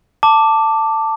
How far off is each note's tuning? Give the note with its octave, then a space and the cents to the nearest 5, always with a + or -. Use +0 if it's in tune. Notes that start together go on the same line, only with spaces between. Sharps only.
A5 +15 D6 +0